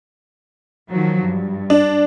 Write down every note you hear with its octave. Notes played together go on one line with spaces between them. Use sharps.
D#3 F3 F#3
G2
D4